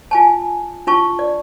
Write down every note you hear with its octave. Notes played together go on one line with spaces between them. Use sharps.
F4 G#5 A5
D4 F4 A5 C#6
D5